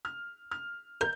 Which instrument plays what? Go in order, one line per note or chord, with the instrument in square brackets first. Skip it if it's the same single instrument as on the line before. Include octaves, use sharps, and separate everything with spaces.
[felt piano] F6
F6
[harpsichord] A#4 [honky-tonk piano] G6